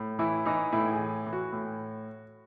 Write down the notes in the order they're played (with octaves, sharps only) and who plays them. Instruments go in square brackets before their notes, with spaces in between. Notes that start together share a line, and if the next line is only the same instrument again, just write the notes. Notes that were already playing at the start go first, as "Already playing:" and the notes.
Already playing: [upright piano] A2
E3 E4
E3 D#4
A2 E4
G#4
E3
E3
F#4
A2